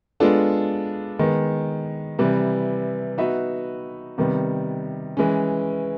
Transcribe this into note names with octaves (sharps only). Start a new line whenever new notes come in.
G#3 B3 D4 F4 A4
D#3 G#3 B3
C3 E3 G3
B3 D#4 F#4 B4 E5
C3 D#3 G3 B3
E3 G#3 C#4